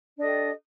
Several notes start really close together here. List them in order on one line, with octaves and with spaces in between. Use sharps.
D4 D#5 A4 G4